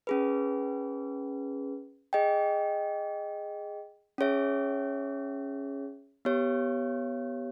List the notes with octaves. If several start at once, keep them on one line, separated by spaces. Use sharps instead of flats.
C#4 G#4 B4
G#4 D#5 G5
C#4 G#4 C#5 E5
B3 G4 C#5